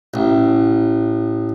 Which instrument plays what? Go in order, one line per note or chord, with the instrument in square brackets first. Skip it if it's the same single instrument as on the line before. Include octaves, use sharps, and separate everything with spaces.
[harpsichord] A1